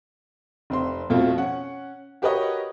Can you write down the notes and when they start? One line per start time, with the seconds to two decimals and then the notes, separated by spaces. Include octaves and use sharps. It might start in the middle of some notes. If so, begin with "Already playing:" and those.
0.70 F1 C4 C6
1.10 F2 B2 A3 C4 F4
1.38 C#4 F#5
2.22 F#4 G4 A#4 B4 C#5 D#5